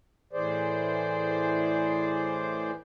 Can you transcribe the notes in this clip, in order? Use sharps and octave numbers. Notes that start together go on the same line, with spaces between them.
A2 E3 G#4 C5 D5